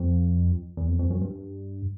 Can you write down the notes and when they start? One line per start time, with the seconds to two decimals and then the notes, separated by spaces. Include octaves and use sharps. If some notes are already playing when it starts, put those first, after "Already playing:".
Already playing: F2
0.77 E2
0.88 F2
0.99 F2
1.10 F#2
1.21 G2